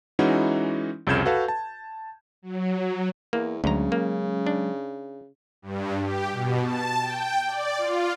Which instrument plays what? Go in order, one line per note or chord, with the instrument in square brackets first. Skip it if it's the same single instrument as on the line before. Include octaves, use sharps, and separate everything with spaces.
[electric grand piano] E3 G#3 C#4 D#4 E4 F#4
C2 F2 C#3 G6 G#6 E7
F#4 A4 B4 F5
A5
[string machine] F#3
[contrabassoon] E2 [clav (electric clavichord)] A#3
[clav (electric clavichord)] D2 A#5 [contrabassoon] C#3 [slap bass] F#3 G#3 C#4
[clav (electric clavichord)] A#3
D4
[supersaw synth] G2
G4
B2
A5
G5
D5
F4